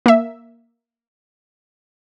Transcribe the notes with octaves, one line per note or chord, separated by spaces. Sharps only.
A#3 E5